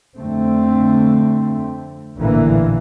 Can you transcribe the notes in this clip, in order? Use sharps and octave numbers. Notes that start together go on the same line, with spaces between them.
F2 D3 A3 C4
A1 A#2 D3 E3 A#3